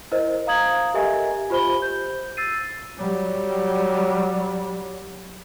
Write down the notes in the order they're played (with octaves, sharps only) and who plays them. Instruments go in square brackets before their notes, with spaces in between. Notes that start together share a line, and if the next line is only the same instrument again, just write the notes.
[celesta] E4 A#4 C5 D#5
F5 A#5 D#6 G#6 F#7
G4 A4 A#4 D#5 E5 G#5
F4 G4 C5 B5 G7
G6
E6 A6 C7 D#7
[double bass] F#3 G3